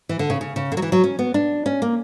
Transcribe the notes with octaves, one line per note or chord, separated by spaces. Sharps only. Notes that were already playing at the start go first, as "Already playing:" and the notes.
E3
D3
C#3
C#3
C#3
D3
F#3
E3
F#3
C#4
B3
D4
C#4
A#3